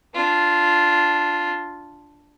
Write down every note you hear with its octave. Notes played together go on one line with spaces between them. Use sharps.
D4 F4